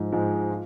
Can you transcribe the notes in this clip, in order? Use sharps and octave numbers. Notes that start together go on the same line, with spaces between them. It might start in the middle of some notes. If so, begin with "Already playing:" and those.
Already playing: G#2 F3 G#3
G#2 F3 G#3
F4